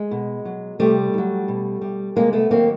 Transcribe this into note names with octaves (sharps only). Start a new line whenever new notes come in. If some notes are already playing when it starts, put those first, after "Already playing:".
Already playing: G#3
B2
F#3
C3 G3 A3
D#3
F#3
B2
G3
C3 G#3 A#3
A3 B3
D#3 F#3 A#3 C4